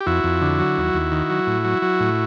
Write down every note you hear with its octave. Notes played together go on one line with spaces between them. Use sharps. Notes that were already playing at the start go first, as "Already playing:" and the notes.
G4
F2 E4 F#4
F2
D3
F#3
D#2
D#2
D#3
F#3
A2
F#3
F#3
A2